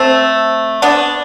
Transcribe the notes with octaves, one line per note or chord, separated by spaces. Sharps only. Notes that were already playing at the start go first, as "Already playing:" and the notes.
Already playing: A3 C4
B3 D4